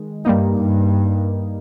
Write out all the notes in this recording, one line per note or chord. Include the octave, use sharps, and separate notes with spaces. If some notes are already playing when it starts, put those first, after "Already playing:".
Already playing: D#3 G#3
G2 G3 A#3 D#4
G2